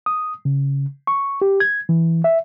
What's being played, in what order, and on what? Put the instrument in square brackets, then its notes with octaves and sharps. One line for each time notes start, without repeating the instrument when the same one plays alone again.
[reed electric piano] D#6
C#3
C#6
G4
G#6
E3
E5